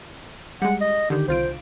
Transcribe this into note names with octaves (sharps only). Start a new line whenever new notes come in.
G3 G#3 F#5
D#5
D3 D#3 G4
C2 F4 C5 D7